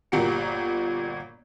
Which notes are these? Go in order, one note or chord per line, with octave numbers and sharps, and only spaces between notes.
G1 A#2 F#4 G4 A#4 C#7